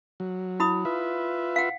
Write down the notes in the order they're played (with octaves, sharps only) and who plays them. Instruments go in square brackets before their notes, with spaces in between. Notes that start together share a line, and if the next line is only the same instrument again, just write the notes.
[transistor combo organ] F#3
[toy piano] E4 B5 D#6
[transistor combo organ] F4 B4 E5
[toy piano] F5 F#5